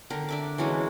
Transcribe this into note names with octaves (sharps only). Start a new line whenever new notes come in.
D3 A#4 G5
D4 E5 D6
E3 F#3 G#3 C#4